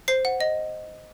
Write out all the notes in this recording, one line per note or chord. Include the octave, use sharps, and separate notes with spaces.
C5 C7
F#5
D#5